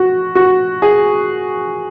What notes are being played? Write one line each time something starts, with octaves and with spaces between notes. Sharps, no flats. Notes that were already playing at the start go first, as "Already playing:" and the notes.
Already playing: F#4
F#4
G#4